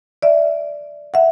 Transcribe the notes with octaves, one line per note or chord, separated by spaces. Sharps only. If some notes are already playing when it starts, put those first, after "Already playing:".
D5 E5
E5 F#5